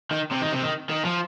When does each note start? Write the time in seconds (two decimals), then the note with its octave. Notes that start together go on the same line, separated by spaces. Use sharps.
0.11 D#3
0.32 C3
0.42 D#3
0.53 C3
0.63 D#3
0.90 D#3
1.05 F3